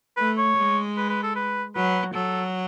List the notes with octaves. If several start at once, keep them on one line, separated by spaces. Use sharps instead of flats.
A3 B4
C#5
G#3
B4
B4
A4
B4
F#3 B4
F#3 A4